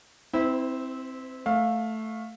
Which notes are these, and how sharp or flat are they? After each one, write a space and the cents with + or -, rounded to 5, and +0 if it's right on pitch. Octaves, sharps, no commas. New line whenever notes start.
C4 +0 E4 -20 C5 -40
A3 +0 F5 +15